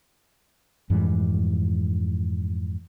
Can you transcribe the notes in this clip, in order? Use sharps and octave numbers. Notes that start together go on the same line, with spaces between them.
F2 G#2 E3 G3